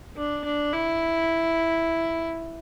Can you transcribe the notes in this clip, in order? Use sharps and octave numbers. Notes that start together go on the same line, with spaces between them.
D4
D4
E4